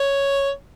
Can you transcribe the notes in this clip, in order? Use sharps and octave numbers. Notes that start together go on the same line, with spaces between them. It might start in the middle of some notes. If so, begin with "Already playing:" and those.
Already playing: C#5